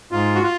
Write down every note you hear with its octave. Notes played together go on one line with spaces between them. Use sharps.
G#2 F4
F#4
F4